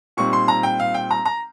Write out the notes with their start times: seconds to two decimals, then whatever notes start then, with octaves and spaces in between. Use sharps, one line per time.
0.17 A#2 G3 C4 D#4 C#6
0.33 C6
0.48 A#5
0.63 G5
0.80 F5
0.94 G5
1.11 A#5
1.25 A#5